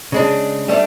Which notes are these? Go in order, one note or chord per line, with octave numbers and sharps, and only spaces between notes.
C#3 G#3 D4
G3 A3 C#4 D4